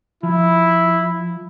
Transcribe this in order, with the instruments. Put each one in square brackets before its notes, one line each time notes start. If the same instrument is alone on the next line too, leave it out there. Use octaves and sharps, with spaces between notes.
[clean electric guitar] F3 [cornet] E4